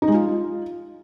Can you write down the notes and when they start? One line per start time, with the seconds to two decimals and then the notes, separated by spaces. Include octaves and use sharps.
0.02 D#4
0.08 G#3
0.14 F4